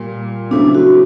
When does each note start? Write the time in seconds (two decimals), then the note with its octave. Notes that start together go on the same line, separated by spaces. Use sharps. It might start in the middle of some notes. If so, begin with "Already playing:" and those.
Already playing: A#2 G3 A#3
0.51 C#3 F#3 A3 C4 D4 E4
0.74 F#4